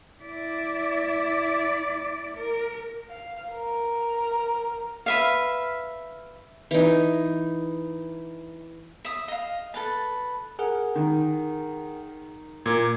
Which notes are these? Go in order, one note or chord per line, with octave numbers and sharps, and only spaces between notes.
E4 D5
A#4
F5
A#4
B4 E5 F5
E3 D#4
E5 D#6
D#5 F5
A4 B4 A5
G#4 A#4 F#5
D#3
A#2 A#4 D6 G#6